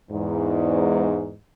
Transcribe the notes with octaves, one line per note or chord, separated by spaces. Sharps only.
E2 G#2